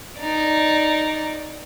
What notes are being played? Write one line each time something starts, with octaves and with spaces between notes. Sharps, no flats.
D#4 D5